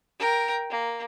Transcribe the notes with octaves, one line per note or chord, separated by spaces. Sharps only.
A#4 G5
A#3